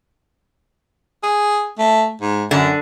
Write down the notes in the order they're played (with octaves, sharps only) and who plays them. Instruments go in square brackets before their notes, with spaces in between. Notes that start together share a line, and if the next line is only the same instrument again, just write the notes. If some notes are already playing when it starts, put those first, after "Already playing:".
[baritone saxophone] G#4
A3
G#2
[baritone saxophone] F#2 [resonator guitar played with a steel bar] D3